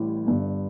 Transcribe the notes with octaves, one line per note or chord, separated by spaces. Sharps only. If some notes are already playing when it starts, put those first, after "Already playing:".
Already playing: A1 A2 E3 G3
G1 G2 D3